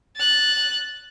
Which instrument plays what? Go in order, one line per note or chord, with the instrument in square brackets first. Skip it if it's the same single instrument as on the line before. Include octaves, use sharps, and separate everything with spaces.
[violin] F#6 A6